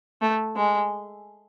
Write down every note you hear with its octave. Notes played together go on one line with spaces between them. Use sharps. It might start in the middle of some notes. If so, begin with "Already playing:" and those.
A3
G#3